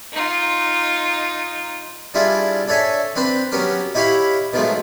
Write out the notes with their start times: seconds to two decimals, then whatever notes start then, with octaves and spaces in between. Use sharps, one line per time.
0.13 D#4 F4
2.14 G3 D4 E4 F4 G#4
2.68 D4 A4 C#5 E5 G#5
3.16 C4 D4 B4 C5
3.52 F#3 B3 C#4 G4 A#4
3.95 D#4 E4 G4 C#5 F5 B5
4.53 B2 D#3 F3 F#3 G#3 A3